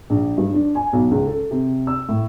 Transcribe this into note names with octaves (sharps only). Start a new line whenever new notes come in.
A#1
G2
D4
G#5
B1
C#2
A4
C3
E6
A2